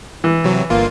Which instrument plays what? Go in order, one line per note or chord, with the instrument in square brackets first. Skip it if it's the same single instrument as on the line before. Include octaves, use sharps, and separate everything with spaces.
[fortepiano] E3
[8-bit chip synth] C3 F#3
G1 A#3 F4